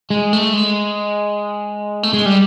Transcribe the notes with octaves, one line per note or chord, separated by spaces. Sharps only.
G#3
A3
G#3
A3
G#3
G3